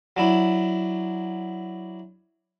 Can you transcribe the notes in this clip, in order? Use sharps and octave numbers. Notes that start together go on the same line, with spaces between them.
F#3 D4 E4